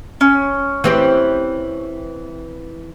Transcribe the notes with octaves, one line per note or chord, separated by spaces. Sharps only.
C#4
E3 C4 G4